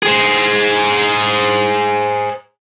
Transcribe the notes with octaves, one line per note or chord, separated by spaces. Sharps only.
G#4 C5